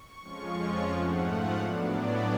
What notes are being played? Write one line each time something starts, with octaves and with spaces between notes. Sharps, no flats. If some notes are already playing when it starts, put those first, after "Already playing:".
Already playing: C#6
F2 F3 G#3 C#4 F4
G#2 F3 A3 F#5
F5
A2 F#3 B3 D4 D5